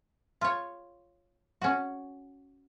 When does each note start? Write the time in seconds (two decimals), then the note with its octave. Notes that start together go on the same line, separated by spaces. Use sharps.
0.41 F4 C#5
1.62 C#4 F#4